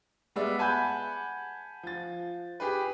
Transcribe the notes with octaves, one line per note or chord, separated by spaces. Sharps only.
G3 G#3 B3 B4 D5 E5
F#5 G#5 A5 B5 F#6 G6
F3 A6
G4 G#4 B4